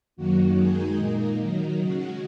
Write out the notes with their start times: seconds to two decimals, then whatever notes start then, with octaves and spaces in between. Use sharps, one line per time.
0.16 F#2 D#3 F#3 A#3 F#4
0.56 D#3 G#3 D#4 G#4
0.97 A#2 A#3 D#4
1.38 D#3 F#3 D#4
1.78 C#3 G#3 F#4